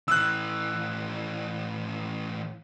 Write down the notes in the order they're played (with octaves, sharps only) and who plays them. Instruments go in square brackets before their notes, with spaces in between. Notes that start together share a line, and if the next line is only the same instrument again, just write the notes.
[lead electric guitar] A2 E3 [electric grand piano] E6 F#6